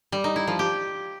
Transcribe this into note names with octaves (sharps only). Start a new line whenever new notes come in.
G3
D#4
E4
F3
G4